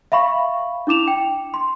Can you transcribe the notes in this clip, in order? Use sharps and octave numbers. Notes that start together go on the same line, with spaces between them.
E5 F5 B5 C#6
D4 E4 D6 E7 F7
G5
C6